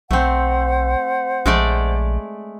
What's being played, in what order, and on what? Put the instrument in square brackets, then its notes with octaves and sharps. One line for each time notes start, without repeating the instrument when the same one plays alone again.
[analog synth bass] B1 [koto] A3 C4 [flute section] C5 F#5
[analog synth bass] A#1 [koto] G#3 A3 D5